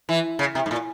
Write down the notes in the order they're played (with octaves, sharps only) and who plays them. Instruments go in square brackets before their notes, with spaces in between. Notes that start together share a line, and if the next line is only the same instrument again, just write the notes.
[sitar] E3
C#3
C3
G#2
A#2